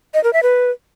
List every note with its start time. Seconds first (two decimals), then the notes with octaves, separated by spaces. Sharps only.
0.14 D#5
0.24 A#4
0.33 E5
0.43 B4